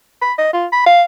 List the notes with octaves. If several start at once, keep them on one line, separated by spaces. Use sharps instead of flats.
B5
D#5
F4
B5
F5